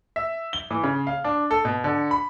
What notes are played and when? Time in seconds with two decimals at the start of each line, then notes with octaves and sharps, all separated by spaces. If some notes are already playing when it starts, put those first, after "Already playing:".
0.16 E5
0.53 G7
0.71 E3
0.84 C#3
1.07 F5
1.24 D4
1.51 A4
1.65 B2
1.84 D3
2.11 B5